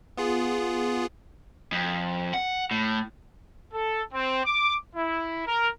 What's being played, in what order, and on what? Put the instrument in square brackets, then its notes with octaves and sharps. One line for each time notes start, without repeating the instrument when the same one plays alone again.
[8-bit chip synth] B3 F4 G#4
[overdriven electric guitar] F2
F#5
A2
[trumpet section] A4
C4
D6
E4
A#4